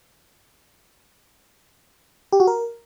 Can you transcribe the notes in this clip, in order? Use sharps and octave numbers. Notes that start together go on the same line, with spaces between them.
G4
F#4
A#4